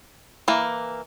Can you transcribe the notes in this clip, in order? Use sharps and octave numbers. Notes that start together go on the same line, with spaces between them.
E3 A#3